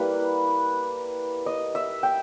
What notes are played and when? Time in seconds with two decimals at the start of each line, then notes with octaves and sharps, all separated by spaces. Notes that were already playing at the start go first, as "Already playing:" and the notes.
Already playing: G3 A#3 E4 B4
1.46 D#5
1.75 E5
2.03 G5